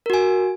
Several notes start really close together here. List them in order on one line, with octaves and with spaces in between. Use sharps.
A#4 F#4 G#5